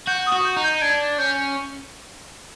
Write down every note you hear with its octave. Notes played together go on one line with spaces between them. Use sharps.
F#4 G6
D#6
F#4
G6
D#4
G6
D4 G#6
C#4 G6